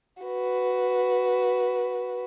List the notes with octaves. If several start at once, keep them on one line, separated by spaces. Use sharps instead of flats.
F#4 B4